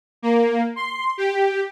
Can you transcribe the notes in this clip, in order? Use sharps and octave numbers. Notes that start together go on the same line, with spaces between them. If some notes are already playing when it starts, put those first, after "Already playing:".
A#3
C6
G4